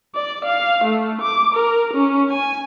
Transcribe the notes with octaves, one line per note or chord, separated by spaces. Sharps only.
D5
F5
A3
D6
A#4
C#4
G#5